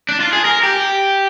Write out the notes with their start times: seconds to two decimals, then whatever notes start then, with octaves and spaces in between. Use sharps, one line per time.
0.09 D4
0.20 F4
0.33 G#4
0.45 A#4
0.63 G4